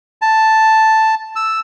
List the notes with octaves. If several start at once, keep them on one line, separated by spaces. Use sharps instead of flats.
A5
E6